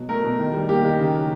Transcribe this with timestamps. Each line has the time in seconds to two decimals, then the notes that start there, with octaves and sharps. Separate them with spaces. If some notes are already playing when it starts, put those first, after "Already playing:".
Already playing: B2 F#3
0.09 A3 A#4
0.24 B2
0.39 D#3
0.54 G3
0.69 A#3 G4
0.84 D#3
0.99 C#3
1.14 F#3